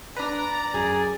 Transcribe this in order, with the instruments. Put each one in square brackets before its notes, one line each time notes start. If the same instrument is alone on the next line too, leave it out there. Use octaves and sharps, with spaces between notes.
[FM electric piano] D4 B4 [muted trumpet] D5 [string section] A#5
[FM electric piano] F#2 [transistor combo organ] G#4